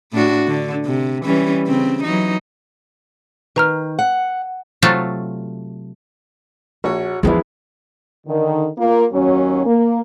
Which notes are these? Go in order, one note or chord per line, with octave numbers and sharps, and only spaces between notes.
A2 D4 F#4
D3
C3
E3 G3 C#4
C#3 C4
E3 F#3 D#4
D#3 B4 A#5 F6
F#5
C3 F#3 A3 F4 A4
A#1 F#4 C#5
E2 G2 F3 G#3 B3 C#4 D4 E4
D3 D#3
A#3 F4
D#2 F#3 C#4
A#3